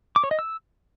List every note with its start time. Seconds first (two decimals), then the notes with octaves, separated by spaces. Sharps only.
0.16 D6
0.24 C#5
0.31 D#5
0.39 E6